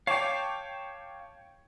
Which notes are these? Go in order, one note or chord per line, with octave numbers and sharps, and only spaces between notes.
C#5 F5 G5 A5 D6